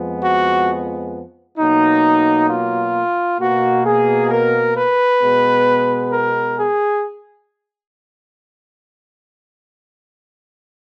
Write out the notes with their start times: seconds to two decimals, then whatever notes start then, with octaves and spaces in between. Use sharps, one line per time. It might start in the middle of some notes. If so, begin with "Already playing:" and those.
Already playing: F2 F3 G#3 B3
0.22 F#4
1.58 B2 F#3 A#3 D#4
2.49 F4
3.40 B2 A#3 F#4
3.85 G#4
4.31 A#4
4.77 B4
5.21 B2 G#3 B3
6.12 A#4
6.58 G#4